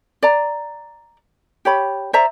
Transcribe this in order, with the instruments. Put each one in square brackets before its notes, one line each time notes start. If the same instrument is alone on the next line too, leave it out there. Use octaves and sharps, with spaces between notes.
[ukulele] D5 A#5
G4 C#5 B5
C5 D5 E5 A#5